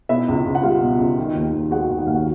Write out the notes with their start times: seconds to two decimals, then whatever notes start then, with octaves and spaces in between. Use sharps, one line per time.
0.09 B2 E4 E5
0.28 C#2
0.46 C#2
0.55 F#5
0.63 G3 F4 F5
0.82 B2
0.99 C#2
1.18 D#3
1.35 D#2
1.53 D#2
1.71 G#3 F#4 F#5
1.89 D#3
1.99 F#5
2.07 D#2 F5
2.15 F#4 F#5